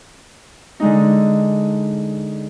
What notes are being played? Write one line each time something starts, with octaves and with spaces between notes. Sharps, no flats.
D3 G#3 D#4